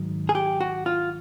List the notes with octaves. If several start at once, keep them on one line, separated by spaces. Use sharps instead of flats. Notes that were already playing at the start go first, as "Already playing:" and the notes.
Already playing: G#2 D#3 F#3
G#4
G4
F#4
F4